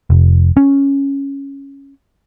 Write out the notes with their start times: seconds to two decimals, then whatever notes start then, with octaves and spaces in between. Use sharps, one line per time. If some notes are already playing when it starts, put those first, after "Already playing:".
0.10 F1
0.57 C#4